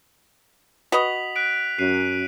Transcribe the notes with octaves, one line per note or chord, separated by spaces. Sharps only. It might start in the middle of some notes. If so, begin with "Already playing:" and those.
F#4 B4 D#5 B6 F7 F#7
F#6 B6 D7
F#2 F#6 C7 D#7